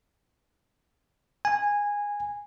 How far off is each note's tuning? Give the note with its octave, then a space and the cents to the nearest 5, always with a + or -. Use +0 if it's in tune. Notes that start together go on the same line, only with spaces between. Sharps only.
G#5 -15